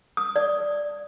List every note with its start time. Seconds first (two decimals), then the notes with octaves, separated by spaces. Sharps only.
0.17 D#6
0.36 D5